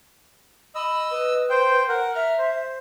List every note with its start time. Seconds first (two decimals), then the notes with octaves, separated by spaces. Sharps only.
0.75 D#5 B5 E6
1.11 B4
1.50 C5 G5
1.88 A#4 F#5
2.15 E5 A#5 F6
2.38 C5